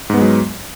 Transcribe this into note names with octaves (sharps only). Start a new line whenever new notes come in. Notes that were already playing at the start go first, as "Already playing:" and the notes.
G#2 F#3 G#3 B3